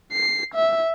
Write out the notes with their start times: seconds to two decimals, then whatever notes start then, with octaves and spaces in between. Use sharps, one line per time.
0.12 C7
0.54 E5